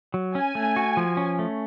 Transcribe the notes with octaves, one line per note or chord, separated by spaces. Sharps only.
F#3
C#4 G#5
A3
F#4
F3
C#4
A3